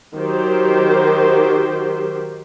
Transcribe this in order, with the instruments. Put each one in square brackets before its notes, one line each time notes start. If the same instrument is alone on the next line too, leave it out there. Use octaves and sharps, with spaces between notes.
[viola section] D#3 F#3 G4 C5